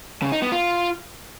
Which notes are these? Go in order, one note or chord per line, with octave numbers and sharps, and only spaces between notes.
C#3
D#4
B3
F4